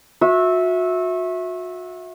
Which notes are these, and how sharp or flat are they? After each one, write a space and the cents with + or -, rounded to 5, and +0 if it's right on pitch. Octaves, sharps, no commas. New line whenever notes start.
F#4 -35 E5 -10